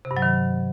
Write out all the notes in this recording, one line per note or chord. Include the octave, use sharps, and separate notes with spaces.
C3
G2
F#3
D#3